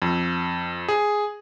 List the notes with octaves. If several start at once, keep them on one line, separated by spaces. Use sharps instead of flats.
F2
G#4